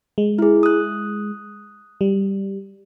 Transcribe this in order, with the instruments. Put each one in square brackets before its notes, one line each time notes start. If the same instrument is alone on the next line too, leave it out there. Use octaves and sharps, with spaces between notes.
[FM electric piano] G#3
[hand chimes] E4 G#4
D#6 F#6
[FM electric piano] G3